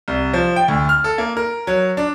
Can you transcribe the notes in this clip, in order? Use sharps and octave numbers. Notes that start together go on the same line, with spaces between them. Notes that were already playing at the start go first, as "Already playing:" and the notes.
C2
F3
G5
D2
F6
A4
A#3
A#4
F#3
D4